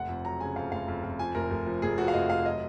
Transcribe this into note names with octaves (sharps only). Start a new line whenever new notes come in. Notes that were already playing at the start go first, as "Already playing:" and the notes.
Already playing: F1 F#5
F2
F#3 A#5
C#3 G#5
F2 F5
F1 F5
F2
F2
F3 G#5
F1 A#4
F1
F3
F1 G#4
F3 F#4
F5
F1 D#5
F1 F5
F#3 D#5